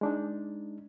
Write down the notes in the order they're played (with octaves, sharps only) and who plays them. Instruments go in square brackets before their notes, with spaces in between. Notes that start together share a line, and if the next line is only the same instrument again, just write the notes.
[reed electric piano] G#3 D4 D#4